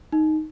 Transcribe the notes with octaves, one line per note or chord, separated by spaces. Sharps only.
D#4